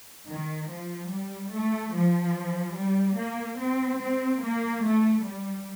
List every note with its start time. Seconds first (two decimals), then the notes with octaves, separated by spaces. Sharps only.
0.28 D#3
0.69 F3
1.10 G3
1.52 A3
1.93 F3
2.76 G3
3.17 A#3
3.58 C4
4.00 C4
4.41 A#3
4.83 A3
5.23 G3